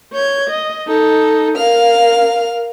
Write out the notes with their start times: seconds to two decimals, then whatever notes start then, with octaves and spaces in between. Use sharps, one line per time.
0.13 C#5 G6 G#6
0.48 D#5
0.87 D#4 A4
1.56 A#4 F5 F6